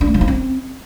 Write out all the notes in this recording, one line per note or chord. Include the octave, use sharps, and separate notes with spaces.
D4
A3
F3
D#4
C4